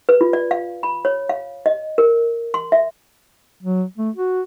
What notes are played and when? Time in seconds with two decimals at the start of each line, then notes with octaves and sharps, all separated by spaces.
0.09 B4
0.21 F4
0.33 D5
0.51 F5
0.83 B5
1.05 C#5
1.29 F5
1.66 D#5
1.98 A#4
2.54 C6
2.72 E5
3.63 F#3
3.98 A3
4.16 F#4